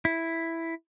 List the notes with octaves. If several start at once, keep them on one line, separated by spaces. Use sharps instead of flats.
E4